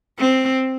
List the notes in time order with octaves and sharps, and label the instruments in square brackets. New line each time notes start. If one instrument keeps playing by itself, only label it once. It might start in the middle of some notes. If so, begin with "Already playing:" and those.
[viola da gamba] C4